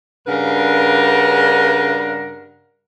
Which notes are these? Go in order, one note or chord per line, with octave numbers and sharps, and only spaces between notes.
G2 C#3 D4 A#4 B4 F#5